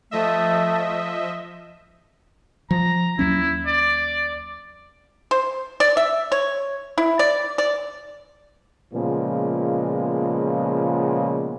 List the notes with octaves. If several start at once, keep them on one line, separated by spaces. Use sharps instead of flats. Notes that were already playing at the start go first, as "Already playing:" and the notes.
F3 A3 D#5 E5
F3 A#5
D#2 F#3 C#4 E4
D5
C5
D5
E5
C#5
E4
D5
D5
A#2 C#3 F3 G#3 B3